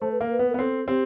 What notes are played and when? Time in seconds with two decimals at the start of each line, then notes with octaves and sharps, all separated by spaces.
0.01 A3 C5
0.12 B4
0.21 A#3 A#4
0.31 B4
0.39 B3
0.50 A#4
0.54 B3
0.59 C4 A4
0.88 C4 G4